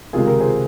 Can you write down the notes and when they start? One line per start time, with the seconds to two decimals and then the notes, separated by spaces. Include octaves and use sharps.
0.13 C#2 C3 D#3 F4 G#4
0.27 G4 A#4
0.41 G#4 C5